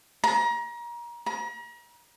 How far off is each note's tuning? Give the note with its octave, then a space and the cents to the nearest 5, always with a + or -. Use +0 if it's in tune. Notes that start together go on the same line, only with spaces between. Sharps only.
A#5 +30
A#5 +40